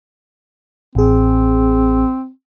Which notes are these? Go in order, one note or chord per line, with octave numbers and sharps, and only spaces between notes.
A1 C4 G#4